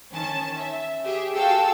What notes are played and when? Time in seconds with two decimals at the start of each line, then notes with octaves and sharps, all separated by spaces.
0.11 D#3 C#4 A5
0.58 E5
1.03 G4 G#4 E5
1.35 F#4 G#4 A4 F5 G5 E6